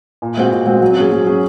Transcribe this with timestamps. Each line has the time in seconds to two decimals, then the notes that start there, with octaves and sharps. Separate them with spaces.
0.22 A#2
0.37 G#3 C4 F#4
0.52 A#2
0.67 G#3 C4 F#4
0.81 F#3
0.97 C#4 G#4
1.12 F#3
1.27 C#4 G#4